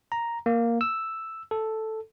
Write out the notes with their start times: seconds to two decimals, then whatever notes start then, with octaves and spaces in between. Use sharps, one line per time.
0.12 A#5
0.46 A#3
0.81 E6
1.51 A4